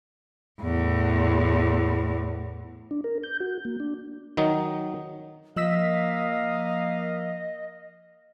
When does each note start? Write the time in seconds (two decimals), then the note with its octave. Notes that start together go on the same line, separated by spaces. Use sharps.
0.61 E2 A2
2.91 D4
3.04 A#4
3.23 G6
3.40 F#4
3.65 A#3
3.80 D4
4.37 D#3 F#3 D#4
5.56 F3 A#3 D#5 F5 E6 B6